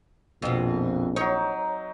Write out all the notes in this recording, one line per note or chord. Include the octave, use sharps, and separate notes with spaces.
A#1 F2 B2
F#3 D#4 C#5